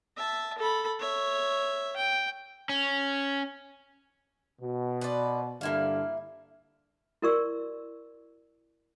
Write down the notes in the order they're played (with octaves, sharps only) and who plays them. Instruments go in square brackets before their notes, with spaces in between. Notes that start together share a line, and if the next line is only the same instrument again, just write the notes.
[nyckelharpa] E5 A5
A4 B5
C#5 E5
G5
[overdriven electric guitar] C#4
[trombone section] B2
[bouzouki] B4 C5 D5
[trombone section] G2 D3 [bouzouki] A#3 E4 F5
[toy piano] E4 F#4 A#4 D5 C#6 E6